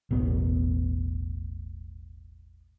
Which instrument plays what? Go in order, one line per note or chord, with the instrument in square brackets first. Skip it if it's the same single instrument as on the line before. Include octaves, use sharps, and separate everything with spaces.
[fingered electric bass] E1 A1 B3